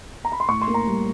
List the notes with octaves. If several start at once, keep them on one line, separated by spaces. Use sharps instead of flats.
A#5
B5
C6
A2 C#6
C6
A#3
A#5
G3